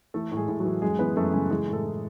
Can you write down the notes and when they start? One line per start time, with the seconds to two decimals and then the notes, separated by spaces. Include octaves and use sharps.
0.14 E3 A3 A4
0.31 A2
0.37 G#3 G#4
0.48 A2
0.60 F#3 F#4
0.65 E3
0.82 F#2 G#3 G#4
0.99 E3 B3 B4
1.16 F#2 A3 A4
1.33 C#3 G#3 G#4
1.50 E3 G#3 G#4
1.68 A2
1.73 A3 A4
1.84 A2